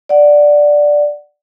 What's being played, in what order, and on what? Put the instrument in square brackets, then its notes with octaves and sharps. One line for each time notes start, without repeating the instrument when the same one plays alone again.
[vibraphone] D5 F#5